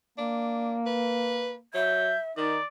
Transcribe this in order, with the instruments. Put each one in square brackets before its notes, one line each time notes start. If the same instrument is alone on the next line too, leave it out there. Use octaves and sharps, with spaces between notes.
[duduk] A#3 [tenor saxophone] D4
[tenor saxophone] B4
[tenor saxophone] F#3 [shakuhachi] E5 [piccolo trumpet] G6
[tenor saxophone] D#3 [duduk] D#4 [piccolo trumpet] D5